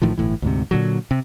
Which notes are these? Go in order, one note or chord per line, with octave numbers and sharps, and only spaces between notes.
A1 A2 D#3 F3
G1 A2 E3
D2 G#2 C3
A#2 D3 F#3
C3